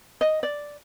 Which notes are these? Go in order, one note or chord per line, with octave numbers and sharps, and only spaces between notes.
D#5
D5